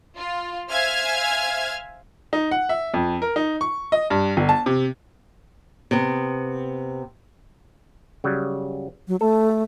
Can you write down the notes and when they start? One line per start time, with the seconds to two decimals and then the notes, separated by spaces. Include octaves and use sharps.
0.17 F4
0.71 C5 E5 F5 G#5 F6 G#6
2.33 D#4
2.51 F#5
2.69 E5
2.94 F2
3.22 A#4
3.36 D#4
3.61 C#6
3.92 D#5
4.10 G2
4.37 G1
4.49 A5
4.66 C3
5.91 C3 B3
8.24 C#3 F#3 G3
9.08 F#3
9.21 A3 A4